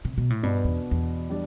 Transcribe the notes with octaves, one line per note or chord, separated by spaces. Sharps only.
C3
B2
A2
G2 B2 B3 D4
E2
E2
G3 D4